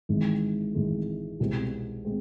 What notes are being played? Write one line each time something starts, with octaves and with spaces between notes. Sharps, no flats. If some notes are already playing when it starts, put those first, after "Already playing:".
G#1 G#2 E3 G#3
G#1 G#2 E3 G#3
C2 B2 G#3 C4
G#3 C4